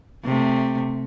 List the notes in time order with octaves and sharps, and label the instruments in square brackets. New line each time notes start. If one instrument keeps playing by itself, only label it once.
[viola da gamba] C3 A3